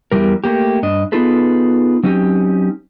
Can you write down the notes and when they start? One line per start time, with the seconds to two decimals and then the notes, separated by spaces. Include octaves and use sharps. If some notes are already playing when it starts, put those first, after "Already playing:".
0.12 E2 C#3 E3 G3 A#4
0.44 A3 A#3 G4
0.83 G2 D4 D#5
1.12 B3 D#4 F4 G#4 A4 B4
2.03 F#3 C4 C#4 D#4 G4